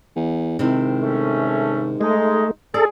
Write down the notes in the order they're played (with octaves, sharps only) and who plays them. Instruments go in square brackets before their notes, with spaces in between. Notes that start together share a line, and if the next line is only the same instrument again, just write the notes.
[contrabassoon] E2
[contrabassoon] G#2 [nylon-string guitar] C3 D#3 E4
[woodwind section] A3 C#4
[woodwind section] G#3 D#4 [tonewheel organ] A3
[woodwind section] G#4 [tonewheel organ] A4 [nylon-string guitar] D5